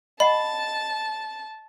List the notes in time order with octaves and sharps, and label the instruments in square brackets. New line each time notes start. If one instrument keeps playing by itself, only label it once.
[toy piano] D#5 F#5 [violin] A5 [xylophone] B5